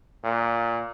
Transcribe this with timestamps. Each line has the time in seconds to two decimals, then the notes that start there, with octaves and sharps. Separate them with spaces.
0.24 A#2